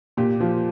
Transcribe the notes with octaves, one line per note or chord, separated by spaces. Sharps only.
A#2 G4
F3